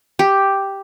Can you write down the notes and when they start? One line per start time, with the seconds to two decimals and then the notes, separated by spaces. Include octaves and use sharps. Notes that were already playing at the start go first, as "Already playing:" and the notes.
0.19 G4